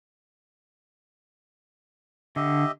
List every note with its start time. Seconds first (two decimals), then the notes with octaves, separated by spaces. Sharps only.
2.36 D3 G4 D#5 E5